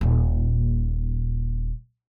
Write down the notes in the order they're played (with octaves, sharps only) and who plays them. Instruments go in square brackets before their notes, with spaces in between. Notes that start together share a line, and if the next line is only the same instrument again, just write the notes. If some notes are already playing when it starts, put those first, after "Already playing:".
[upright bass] D#1 A#2